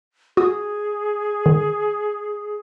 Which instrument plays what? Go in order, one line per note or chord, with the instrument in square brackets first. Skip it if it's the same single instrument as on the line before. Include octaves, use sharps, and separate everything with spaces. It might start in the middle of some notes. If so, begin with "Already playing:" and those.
[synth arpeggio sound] F#4 D#6 [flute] G#4
[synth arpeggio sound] D#3